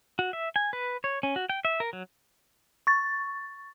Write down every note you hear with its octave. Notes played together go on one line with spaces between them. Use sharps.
F#4
E5
G#5
B4
C#5
C#4
F#4
G5
E5
A#4
F#3
C#6 A6